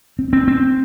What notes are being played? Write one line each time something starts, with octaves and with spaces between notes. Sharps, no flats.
C4
C4
C4